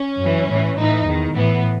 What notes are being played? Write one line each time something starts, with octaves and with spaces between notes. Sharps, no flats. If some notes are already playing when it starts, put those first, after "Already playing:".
Already playing: C#4
F#2 E3
A2 E3
A2 E3 D#4
E2 D#3
A2 E3 B3